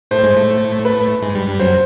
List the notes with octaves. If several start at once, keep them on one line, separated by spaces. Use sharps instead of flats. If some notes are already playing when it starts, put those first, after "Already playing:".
A2 A3 C5
G#2 G#3
A2 A3
B4
G#2 G#3
G2 G3
G2 G3
F#2 F#3 C5